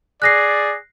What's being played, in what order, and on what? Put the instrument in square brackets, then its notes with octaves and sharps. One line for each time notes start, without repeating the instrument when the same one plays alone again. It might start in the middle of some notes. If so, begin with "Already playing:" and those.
[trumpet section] G#4 D5 [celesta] F#6 A#6 C7